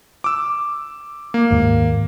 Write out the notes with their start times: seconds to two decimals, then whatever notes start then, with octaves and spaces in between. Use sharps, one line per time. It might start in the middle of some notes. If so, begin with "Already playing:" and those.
0.24 D6 E6
1.34 A#3
1.51 D#2 G#2